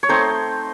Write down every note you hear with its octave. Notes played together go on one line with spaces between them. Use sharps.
C#5
A3 C4 D#4 C5